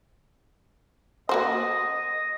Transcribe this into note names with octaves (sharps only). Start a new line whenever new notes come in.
A#3 F#4 C5 D#5